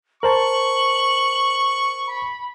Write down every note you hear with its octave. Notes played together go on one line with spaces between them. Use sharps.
A#4 C5 A5 C#6 F#7
B5